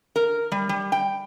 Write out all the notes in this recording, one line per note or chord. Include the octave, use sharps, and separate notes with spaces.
A#4
G3
G3
G5